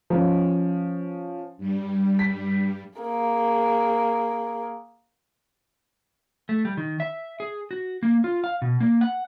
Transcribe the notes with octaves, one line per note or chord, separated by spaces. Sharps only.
F3 C#4
G2 G3
B6
A#3 G#4
A3
G3
D#3
E5
G#4
F#4
A#3
F4
F5
B2
A#3
F#5